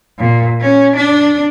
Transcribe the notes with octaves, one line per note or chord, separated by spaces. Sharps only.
A#2
C#4
D4